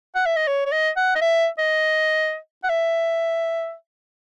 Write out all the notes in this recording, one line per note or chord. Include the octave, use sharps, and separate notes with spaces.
F#5
E5
D#5
C#5
C#5
D#5
F#5
D#5
E5
D#5
F#5
E5